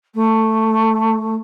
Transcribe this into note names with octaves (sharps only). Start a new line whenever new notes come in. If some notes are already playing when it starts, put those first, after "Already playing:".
A3